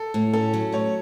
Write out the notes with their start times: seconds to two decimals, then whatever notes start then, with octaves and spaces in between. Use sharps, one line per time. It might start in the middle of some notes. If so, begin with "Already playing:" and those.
Already playing: A4
0.14 A2
0.33 C#4 A4
0.53 F#3
0.72 A2 C#5